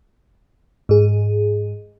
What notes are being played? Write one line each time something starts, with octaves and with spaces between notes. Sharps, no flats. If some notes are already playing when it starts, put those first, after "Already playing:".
G#2 G#4